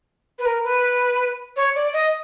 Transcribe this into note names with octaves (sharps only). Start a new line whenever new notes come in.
B4
A#4
B4
C#5
D5
D#5